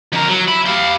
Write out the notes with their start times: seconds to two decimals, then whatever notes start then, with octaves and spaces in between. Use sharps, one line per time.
0.12 F2 A#4
0.28 F#3
0.48 E5 B5
0.66 G4 F5